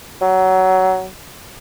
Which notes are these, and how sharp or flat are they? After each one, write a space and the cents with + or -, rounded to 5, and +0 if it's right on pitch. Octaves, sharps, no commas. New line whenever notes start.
F#3 +20